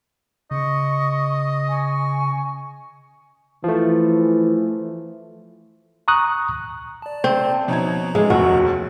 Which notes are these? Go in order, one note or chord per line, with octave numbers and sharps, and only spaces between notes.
C#3 D#5 C#6
G#5 C#6
E3 F3 A3
A#5 C#6 D#6 F#6
D5 A5
C3 C4
B2 F3 D#4 C#5 A#5 G#6
A2 D3 E3 G#3
F1 A#1 D#2 F#4